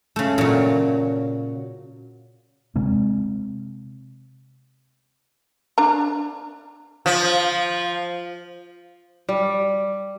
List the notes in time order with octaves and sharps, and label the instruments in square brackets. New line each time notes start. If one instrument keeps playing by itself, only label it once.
[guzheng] C#3 A3
A#2 F#3
[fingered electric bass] C3 G#3 C4
[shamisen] D4 A#5
[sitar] F3
[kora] G3